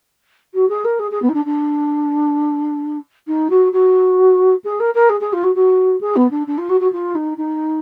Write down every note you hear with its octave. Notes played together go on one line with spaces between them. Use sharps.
F#4
G#4
A#4
G#4
G#4
B3
D#4
D4
D4
D#4
F#4
F#4
G#4
A#4
A#4
G#4
G#4
F4
F#4
F#4
G#4
B3
D4
D4
F4
F#4
F#4
F4
D#4
D#4